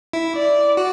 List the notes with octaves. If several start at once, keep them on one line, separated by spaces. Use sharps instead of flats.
E4
D5
F#4